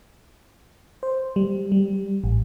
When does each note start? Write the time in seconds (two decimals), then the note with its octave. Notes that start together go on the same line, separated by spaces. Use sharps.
1.03 C5
1.36 G3
1.72 G3
2.24 A1